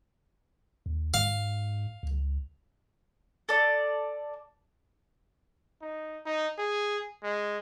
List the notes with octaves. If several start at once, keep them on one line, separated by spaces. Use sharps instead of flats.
D#2
G#2 F5
C#2
A4 D5
D#4
D#4
G#4
G#3